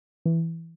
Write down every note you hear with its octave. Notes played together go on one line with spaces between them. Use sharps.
E3